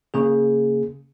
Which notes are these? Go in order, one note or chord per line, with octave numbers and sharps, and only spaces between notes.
C#3 A#3 G#4